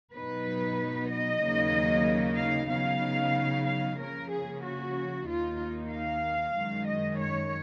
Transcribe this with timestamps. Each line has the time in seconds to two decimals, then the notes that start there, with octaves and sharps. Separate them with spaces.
0.14 B2 F#3 B3 D#4 B4
1.10 D#5
1.42 D#2 C#3 F#3 A#3 D#4
2.39 F5
2.70 C#3 F#3 B3 D#4 F5
3.66 F5
3.98 C#3 F3 A#3 C#4 A#4
4.31 G#4
4.62 F#4
5.27 D#2 D#3 A#3 D#4 F4
5.91 F5
6.55 F#2 D#3 G#3
6.88 D#5
7.20 C#5